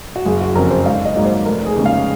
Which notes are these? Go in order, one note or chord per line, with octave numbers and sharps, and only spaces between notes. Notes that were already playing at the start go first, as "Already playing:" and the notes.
F#4
F#1 G#4
F#4
F2 C#3 A#4
C5
G#1 F5
D#5
G#2 F#3 A#3
C5
F1 A#4
G#4
D#2 C#3 G#3
F5